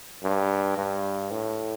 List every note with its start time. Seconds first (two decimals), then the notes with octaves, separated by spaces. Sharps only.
0.23 G2
0.78 G2
1.31 A2